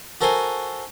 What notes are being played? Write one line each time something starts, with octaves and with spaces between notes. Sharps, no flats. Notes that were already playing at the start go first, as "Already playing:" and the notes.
F#4 A4 A#4 C5 G#5